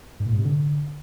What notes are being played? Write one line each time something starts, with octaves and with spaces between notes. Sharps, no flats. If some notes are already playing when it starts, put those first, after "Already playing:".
G#2
A#2
G#2
C3
D3